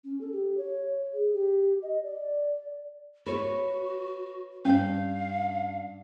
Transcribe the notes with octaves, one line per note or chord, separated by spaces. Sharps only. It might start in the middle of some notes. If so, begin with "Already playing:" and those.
C#4
A4
G4
C#5
G#4
G4
D#5
D5
F#4 B4 C#5
G2 C#4 C#5 F5